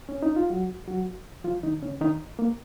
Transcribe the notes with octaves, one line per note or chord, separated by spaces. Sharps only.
C#4
D#4
F4
F#3 F#4
F#3 F#4
F3 F4
D#3 D#4
C#3 C#4
D#3 D#4
A#3